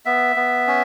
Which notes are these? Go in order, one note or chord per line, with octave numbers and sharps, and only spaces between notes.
B3 E5
B3
C#4